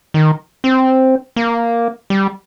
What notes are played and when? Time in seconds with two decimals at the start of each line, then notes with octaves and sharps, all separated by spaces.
0.14 D#3
0.64 C4
1.36 A#3
2.10 G3